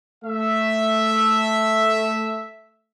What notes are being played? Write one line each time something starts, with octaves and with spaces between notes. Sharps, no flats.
A3 E5